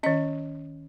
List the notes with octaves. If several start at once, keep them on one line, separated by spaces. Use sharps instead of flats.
D#3 C#4 D#5